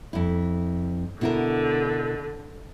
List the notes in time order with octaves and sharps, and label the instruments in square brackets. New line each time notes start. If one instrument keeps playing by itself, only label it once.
[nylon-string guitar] F2 E4
[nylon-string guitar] B2 E4 A#4 [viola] D3